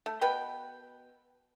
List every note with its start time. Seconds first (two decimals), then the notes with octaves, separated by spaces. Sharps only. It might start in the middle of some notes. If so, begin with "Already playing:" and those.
0.06 A3
0.21 B2 B4 G5 B5